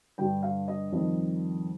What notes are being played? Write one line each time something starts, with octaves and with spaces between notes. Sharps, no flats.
G2 D3 G3 G5
F5
D#5
F2 D#3 G3 D#5